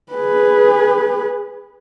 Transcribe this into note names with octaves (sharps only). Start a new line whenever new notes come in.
G#4 B4